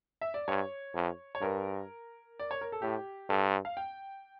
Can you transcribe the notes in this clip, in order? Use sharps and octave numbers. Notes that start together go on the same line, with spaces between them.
E5
D5
G2 C#5
F2
C#5
G2 A#4
D5
C#5
A#4
A4
A2 G4
G2 A4
F5
G5